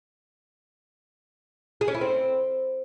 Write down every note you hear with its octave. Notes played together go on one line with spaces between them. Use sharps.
G#4
C#4
E4
C4